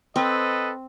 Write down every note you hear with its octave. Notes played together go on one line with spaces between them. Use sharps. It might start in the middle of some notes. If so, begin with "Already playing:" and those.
C4 A4 B4 D#5